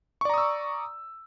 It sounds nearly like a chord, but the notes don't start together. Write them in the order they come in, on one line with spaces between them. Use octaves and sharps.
C#6 D5 A#5 D#6 E6